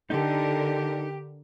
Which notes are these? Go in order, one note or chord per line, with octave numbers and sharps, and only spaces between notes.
D3 D#4 G4 A4 A#4